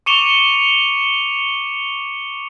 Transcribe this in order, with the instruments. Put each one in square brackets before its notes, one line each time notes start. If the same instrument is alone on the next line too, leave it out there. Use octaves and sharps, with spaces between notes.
[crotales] C#6 D6 C#7 E7 F7 G7